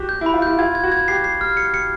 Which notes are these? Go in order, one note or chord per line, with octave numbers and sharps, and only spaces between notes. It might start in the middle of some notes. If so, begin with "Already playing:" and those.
Already playing: F#4 G4
G6
E4 B5
F4
E4 G6
F4 G#6
G#6
F#4
G#6
G4 C7
C7
F6
C#7
C#7